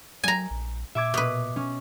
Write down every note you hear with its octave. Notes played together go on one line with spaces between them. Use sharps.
F#3 G#5 A#5
A#1
A#2 E5 D6 G#6
B2 B4
C#4